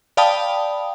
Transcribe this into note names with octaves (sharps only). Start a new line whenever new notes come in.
D5 F5 G5 A5 B5 D#6